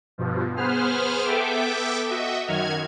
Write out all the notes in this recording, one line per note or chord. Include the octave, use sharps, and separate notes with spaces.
G2 B2 F3
B3 G#4 B4 C5 F6
B3 A4 E5 G5 D6
F#4 D#5 E5
F#2 D#3 F#4 F6 G#6